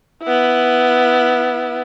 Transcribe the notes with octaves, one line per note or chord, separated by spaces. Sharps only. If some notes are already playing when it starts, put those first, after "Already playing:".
B3 E4